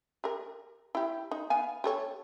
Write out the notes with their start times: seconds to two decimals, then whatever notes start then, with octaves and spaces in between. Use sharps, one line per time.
0.24 G4 A#4
0.95 E4 G4
1.31 D#4
1.50 B3 F5 G#5
1.84 G4 A4 C#5